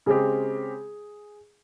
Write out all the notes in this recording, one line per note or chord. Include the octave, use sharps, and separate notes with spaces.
C#3 G#3 C4 G4 G#4